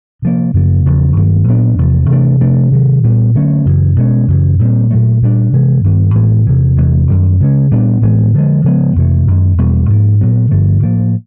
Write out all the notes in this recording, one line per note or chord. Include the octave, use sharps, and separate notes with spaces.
C3 F3 A#3
F#2 C#3 F3 A#3
E2 C#3 F3
G2 D#3 F#3 A#3
A#2 F#3 B3 D4
E2 C3 F3
C3 E3 A3 D4
C3 F3 A3 D4
C3 D#3 F#3
A#2 G3 B3
D3 F#3 A3 C#4
F#2 C#3 E3
B2 G#3 C#4
F#2 C#3 E3
A#2 G3 C4
A#2 F#3 A3
A#2 G3 B3 D4
C3 E3 G#3
G2 D#3 G3 B3
A2 E3 G#3 B3
E2 C3 E3
E2 C3 E3 G#3
F#2 D#3 G3
C#3 E3 G#3 C#4
A#2 G3 B3 D4
A2 E3 G#3 B3
D3 F3 G#3
C#3 F3 G#3 B3
F2 C3 E3 A3
F#2 D#3 G#3
E2 B2 G3 B3
G#2 F3 A#3
A#2 F#3 B3
G2 D3 F3 A3
A2 F3 A#3